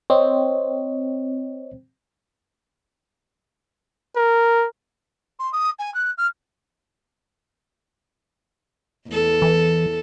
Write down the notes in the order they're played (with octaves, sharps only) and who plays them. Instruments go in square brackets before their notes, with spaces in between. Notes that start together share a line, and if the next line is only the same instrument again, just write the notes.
[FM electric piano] C4 [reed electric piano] C#5 D#5
[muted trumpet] A#4
[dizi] C6
D#6
G#5
F#6
F6
[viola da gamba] E2 A4
[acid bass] E3